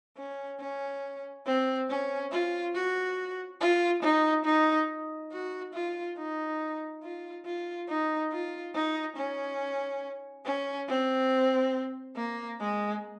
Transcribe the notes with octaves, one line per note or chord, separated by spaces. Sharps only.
C#4
C#4
C4
C#4
F4
F#4
F4
D#4
D#4
F#4
F4
D#4
F4
F4
D#4
F4
D#4
C#4
C#4
C4
A#3
G#3